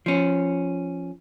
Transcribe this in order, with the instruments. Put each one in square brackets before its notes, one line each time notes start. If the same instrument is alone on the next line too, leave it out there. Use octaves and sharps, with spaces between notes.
[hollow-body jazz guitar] F3 C#4